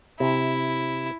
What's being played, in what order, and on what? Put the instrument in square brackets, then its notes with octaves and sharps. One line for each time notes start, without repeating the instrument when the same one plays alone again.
[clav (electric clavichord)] C3 [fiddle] E4